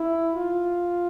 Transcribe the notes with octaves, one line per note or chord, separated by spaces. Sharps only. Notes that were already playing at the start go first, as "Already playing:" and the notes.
Already playing: E4
F4